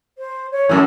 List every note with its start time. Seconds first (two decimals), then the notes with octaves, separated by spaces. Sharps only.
0.18 C5
0.51 C#5
0.69 F#2 A2 E6